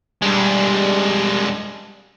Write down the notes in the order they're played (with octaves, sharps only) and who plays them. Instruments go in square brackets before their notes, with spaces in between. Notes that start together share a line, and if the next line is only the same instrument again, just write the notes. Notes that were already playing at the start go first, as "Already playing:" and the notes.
[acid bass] G3 [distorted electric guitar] G#3 D4